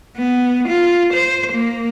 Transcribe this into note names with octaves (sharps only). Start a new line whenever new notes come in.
B3
F4
C5
A#3